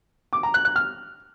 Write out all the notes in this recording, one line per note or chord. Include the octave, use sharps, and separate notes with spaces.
D6
A#5
F#6
F#6
F6